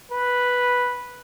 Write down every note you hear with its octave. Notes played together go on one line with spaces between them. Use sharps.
B4